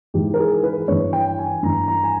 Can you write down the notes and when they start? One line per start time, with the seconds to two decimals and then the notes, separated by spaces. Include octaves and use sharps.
0.14 G#2 E3 G4
0.34 A#4
0.39 G#4
0.63 B4
0.88 G2 E3 C#5
1.13 G5
1.39 G#5
1.63 G2 E3 A#5
1.88 A#5
2.04 G#5